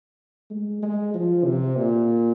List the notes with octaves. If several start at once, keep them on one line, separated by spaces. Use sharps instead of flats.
G#3
G#3
F3
C3
A#2